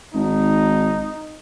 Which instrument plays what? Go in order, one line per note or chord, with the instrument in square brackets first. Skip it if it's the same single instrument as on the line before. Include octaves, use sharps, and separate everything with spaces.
[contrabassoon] G#1 [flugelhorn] D#4